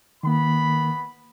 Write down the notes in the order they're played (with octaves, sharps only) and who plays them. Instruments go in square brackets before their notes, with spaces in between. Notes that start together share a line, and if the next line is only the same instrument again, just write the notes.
[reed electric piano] D#3 A#3 [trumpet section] B3 B5